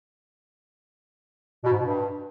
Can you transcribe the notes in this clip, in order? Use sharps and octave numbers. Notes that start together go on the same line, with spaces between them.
B2
G#2
B2
G2